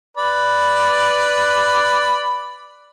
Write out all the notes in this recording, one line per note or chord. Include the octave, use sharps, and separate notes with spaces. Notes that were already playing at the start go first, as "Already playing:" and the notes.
B4 D5 B5